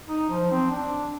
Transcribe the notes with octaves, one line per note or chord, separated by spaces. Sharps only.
D#4
F3
C4
D4